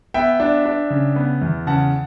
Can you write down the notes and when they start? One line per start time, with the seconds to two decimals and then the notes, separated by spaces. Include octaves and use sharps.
0.14 B3 E5 G5
0.40 D4
0.66 D4
0.90 C#3
1.16 B3
1.42 E2
1.67 C#3 F#5 A5